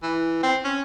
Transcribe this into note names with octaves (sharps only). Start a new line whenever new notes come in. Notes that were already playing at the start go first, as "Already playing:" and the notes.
E3
C4
C#4